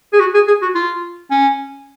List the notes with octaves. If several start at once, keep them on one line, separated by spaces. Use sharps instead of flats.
G#4
F#4
G#4
G#4
F#4
F4
C#4